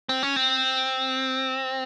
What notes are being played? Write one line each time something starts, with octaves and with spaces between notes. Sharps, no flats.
C4
C#4
C4